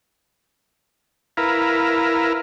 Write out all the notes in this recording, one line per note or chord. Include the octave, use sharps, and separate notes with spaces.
E4 A#4 B4 F5